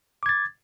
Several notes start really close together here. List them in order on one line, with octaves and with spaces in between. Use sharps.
D6 G#6 A6